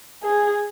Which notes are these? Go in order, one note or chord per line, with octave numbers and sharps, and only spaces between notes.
G#4